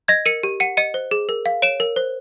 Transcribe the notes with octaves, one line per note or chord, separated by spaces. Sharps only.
D#5 G#6 A#6
A#4 C#7 D#7
G4
F#5 C#7 D#7
D#5 C#7 D#7
C5
G#4
A#4
F5
C#5 D7 E7
A#4
C5